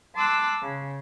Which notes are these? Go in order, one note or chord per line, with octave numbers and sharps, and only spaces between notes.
A5 C6 D6 E6 F#6
C#3